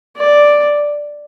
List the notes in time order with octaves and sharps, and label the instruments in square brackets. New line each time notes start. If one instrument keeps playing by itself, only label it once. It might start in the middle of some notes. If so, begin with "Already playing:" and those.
[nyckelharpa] D5